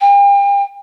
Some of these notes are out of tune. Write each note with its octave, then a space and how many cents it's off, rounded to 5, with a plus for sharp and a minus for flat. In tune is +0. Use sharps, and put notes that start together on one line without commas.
G5 +40